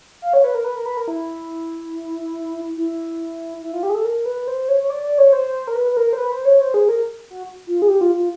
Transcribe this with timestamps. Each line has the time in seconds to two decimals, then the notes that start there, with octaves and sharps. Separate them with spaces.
0.22 F5
0.33 C#5
0.44 B4
0.55 A#4
0.64 B4
0.76 A#4
0.86 B4
0.97 A#4
1.08 E4
2.77 E4
3.62 E4
3.73 F4
3.83 G4
3.89 G#4
3.95 A4
4.05 A#4
4.26 B4
4.48 C5
4.69 C#5
4.81 C#5
4.90 D5
5.04 D5
5.18 C#5
5.32 C5
5.67 A#4
5.76 B4
5.91 B4
5.97 A#4
6.13 C5
6.18 B4
6.32 C5
6.45 C#5
6.61 C5
6.74 G#4
6.89 A#4
7.30 F#4
7.67 F4
7.82 G#4
7.88 G4
8.01 F4
8.16 F4